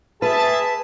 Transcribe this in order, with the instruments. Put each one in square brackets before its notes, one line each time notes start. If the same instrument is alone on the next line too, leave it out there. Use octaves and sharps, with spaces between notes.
[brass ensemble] G#4 E5 A5 [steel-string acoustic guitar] B4